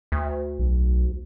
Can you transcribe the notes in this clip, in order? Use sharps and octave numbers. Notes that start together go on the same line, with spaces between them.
D2
B1